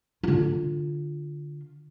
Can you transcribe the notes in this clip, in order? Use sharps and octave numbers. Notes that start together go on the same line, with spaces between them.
D3 F4